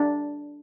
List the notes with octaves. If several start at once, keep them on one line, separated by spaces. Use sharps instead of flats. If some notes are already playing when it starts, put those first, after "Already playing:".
Already playing: D4